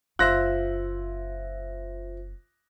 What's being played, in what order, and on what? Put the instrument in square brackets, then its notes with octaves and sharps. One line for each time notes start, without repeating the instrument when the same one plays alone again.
[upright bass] F#1 [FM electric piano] F4 C5 E5 [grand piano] F#6 A#6